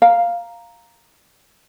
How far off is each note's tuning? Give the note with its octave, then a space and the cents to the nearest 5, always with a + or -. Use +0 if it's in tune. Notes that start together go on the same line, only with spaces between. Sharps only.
F5 +0 A#5 +0